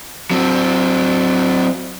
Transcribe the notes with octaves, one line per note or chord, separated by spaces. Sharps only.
F#3 C4